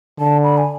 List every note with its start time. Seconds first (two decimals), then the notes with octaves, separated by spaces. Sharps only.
0.19 D3 A5
0.44 B5
0.57 G#5